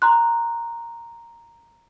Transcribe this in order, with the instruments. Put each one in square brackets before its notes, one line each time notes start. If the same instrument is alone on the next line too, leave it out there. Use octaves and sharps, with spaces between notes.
[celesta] A#5 C6 F#6